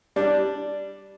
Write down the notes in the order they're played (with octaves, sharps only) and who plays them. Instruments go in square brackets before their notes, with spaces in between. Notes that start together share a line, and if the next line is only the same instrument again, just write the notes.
[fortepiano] G3 D4